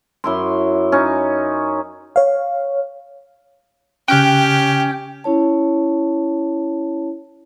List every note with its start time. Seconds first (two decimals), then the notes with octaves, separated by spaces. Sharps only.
0.24 F#2 E4 C6
0.92 C#4 D#4
2.16 C#5 F5
4.08 C#3 C#4 G4 G5 F6 F#6
5.24 C#4 E4 C#5 A5